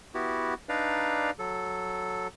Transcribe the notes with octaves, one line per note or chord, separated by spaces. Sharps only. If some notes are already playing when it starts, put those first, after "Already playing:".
B3 E4 F#4 G4
D4 D#4 B4 D5 F5 A#5
F#3 A4